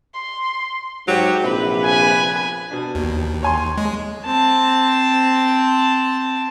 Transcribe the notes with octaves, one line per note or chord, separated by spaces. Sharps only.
C6
G#2 F#3 G4
A#1 C3 B4
G#5
B2 D4
D#2
C#5 G#5 C6
G#3
C4 A5